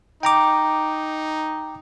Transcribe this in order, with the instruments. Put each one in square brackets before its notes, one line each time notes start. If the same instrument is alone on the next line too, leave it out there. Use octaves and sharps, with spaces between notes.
[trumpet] D#4 [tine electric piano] G5 A#5 D6